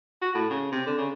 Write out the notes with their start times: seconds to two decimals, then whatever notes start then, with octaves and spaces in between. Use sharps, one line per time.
0.22 F#4
0.35 A2
0.50 C#3
0.72 C3
0.86 D3
0.98 C#3